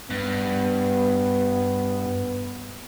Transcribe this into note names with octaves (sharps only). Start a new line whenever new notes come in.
G2 B3